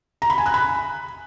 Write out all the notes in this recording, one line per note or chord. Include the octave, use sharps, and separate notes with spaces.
A#5
B5
G#5
F#6
B5